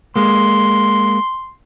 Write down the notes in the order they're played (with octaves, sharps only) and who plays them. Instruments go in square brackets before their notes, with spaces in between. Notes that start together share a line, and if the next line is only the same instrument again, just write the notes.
[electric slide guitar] G#3 A#3 [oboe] C6